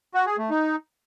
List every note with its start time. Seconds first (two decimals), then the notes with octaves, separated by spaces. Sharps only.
0.14 F#4
0.26 G#4
0.38 A3
0.50 D#4